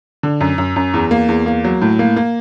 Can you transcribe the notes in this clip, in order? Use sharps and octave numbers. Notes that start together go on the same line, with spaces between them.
D3
F#2
F#2
F#2
E2
A#3
E2
A#3
F#3
A2
A#3
A#3